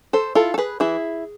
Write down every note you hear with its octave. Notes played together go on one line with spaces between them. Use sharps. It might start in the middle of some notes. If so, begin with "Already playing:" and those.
A4 C5
E4 F4 A4
A4
G#4 B4
E3 E4 G#4